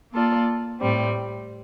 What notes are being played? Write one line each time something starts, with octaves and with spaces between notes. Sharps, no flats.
A#3 F4 A4 D5
A2 G3 C4